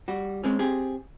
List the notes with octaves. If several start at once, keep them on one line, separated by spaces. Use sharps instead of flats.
G3 F#4
G#3 C4 C#4
C4 G4 G#4